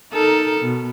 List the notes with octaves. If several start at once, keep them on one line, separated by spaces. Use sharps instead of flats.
D#4 A4 A#4
B2